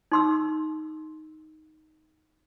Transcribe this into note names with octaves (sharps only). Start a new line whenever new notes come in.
D#4 C6 E6